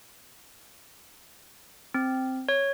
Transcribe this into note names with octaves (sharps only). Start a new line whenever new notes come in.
C4
C#5